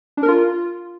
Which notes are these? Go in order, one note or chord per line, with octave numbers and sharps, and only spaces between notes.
D4
A#4
F4